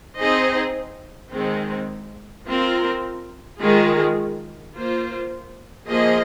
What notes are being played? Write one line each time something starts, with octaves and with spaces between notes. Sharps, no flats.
C4 D#4 G#4 C5 D#5
D#3 G#3 C4
C4 F4 A#4
D#3 G#3 F4 G#4
A#3 F4 C5
F3 A#3 G#4 C5 D#5